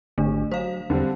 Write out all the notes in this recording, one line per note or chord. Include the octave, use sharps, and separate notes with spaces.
G#1 D3 A3 D4
F#3 C5 F5
E2 D3 G3 C4